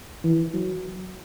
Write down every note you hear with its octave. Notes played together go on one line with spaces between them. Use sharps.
E3
F#3